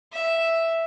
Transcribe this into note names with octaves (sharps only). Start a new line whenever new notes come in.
E5